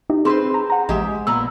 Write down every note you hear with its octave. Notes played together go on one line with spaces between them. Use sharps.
D#4 E4 G4
C4 G#4 B4 C5 C6
A#5
F#5 A#5
A#1 G#3 G4 E5
A#2 B3 A#5 E6